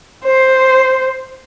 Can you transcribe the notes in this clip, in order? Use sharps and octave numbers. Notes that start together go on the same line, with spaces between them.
C5